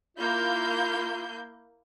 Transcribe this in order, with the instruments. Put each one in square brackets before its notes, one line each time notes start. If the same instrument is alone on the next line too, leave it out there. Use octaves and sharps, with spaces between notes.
[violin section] A#3 E4 G6 [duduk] F4